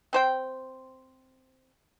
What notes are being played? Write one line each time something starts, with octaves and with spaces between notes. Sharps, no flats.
C4 C5 G5